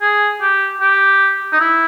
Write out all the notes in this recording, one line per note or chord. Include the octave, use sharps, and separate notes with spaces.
G#4
G4
G4
D#4
E4